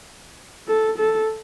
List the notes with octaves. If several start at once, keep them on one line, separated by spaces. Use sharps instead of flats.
A4
A4